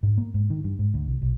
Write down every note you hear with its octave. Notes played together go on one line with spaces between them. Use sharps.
G#2
A#3
G#2
D#3
G2
G#2
D2
C2
B1